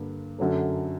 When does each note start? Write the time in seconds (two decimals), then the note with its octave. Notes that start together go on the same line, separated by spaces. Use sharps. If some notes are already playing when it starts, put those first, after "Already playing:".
Already playing: G2 D3 A#3
0.38 F#2 D3 F#3 A3